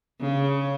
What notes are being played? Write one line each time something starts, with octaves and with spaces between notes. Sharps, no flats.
C#3